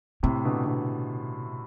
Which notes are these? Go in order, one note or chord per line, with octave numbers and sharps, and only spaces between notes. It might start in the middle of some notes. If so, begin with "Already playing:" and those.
A2 C3 C4
B2 D3
B2 D3